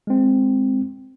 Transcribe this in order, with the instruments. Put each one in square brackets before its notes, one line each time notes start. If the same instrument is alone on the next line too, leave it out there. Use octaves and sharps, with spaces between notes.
[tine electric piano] G#3 C4